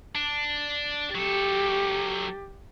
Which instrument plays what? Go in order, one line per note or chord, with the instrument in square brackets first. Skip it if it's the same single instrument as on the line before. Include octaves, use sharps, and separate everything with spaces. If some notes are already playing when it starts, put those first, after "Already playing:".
[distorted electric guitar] D4
[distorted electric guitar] F#3 A4 [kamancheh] G4